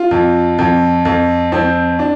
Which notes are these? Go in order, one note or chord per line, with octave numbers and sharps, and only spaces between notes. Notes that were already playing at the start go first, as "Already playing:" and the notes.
Already playing: F4
F2
F2
F2
F2 C4
D4